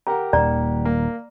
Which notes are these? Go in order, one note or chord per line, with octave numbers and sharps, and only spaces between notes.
G4 A#4 F#5 A#5
D#1 D#2 D5 A#5
A#3